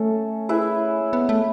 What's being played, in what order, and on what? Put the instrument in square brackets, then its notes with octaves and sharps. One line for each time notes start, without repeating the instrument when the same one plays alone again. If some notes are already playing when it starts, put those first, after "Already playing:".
Already playing: [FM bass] A3 [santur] C#4 A4 E5
[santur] E4 G#4 B4 E5
[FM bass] B3
A3